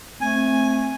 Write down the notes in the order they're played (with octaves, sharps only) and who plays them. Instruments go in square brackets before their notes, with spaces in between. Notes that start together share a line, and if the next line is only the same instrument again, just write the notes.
[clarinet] A3 [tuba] C4 [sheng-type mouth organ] G#5